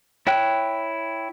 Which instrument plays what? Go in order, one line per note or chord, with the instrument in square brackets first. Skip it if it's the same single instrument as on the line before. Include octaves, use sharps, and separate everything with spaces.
[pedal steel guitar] E4 C#5 G5 F#6